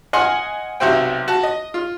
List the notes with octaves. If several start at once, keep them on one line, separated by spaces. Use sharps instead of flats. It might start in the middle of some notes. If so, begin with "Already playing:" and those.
D#5 F#5 G#5 C6 F6
B1 C3 E4 F#4 C5 G5
F#4 A5
D#5
F4